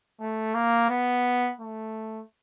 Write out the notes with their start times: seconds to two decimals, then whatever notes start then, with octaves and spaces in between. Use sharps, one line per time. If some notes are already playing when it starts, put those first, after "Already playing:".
0.21 A3
0.55 A#3
0.89 B3
1.59 A3